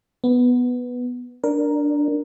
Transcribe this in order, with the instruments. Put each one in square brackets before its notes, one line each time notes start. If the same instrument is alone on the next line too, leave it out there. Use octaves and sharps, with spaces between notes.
[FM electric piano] B3
[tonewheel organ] D4 [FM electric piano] A#4